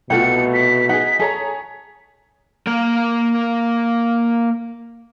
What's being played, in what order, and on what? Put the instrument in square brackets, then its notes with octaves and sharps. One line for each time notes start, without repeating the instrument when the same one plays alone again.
[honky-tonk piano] C2 A3 [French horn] B2 [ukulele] F4 F#5 G5 [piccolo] C#7
[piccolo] B6
[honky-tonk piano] D#4 G#4 [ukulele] F#5
[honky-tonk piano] G#4 C#5 A#5 [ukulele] A4
[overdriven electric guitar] A#3 A#4